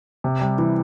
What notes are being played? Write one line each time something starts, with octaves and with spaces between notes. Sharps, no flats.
C3
G3
E3